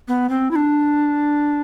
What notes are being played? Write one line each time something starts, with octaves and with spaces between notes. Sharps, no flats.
B3
C4
E4
D4